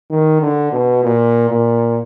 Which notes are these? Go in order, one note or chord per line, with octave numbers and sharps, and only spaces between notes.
D#3
D3
B2
A#2
A#2